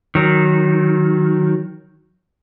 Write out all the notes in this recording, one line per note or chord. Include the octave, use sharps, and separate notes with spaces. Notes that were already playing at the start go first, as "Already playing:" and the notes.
D#3 F#3